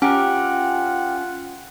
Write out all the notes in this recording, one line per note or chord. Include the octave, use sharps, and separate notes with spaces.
C#4 F4 G4 A#4 F#5